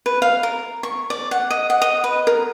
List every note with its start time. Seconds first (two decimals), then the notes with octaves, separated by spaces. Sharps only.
0.06 B4
0.22 F5
0.43 A#4
0.83 C#6
1.10 D5
1.31 F#5
1.51 D#5
1.70 F#5
1.82 D#5
2.04 B4
2.27 A#4